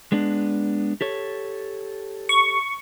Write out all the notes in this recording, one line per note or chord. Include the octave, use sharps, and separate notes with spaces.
G#3 B3 D4
G4 A4 C#5
C#6